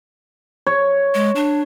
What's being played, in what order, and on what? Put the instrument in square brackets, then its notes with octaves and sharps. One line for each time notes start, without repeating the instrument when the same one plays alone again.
[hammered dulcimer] C#5
[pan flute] G#3
D4